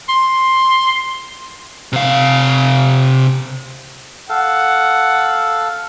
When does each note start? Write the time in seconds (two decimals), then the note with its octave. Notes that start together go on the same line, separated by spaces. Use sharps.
0.09 C6
1.93 C3 F5
4.30 A4 F5 F#5